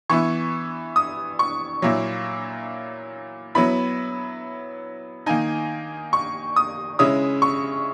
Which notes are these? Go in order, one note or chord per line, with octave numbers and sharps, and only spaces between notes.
E3 B3 E4 C#6
D#6
C#6
A#2 F#3 A#3 E4
F#3 B3 E4 B5
D#3 A#3 D#4 G#5
C#6
D#6
C#3 G#3 C#4 E4 D#6
C#6